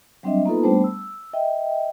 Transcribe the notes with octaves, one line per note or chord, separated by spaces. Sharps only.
F#3 G3 C4 D4 D#5 E5
A#3 B3 D#4 F4 A4 B4
G3 A3 B3 D4 C5 A5
E6
D#5 E5 G5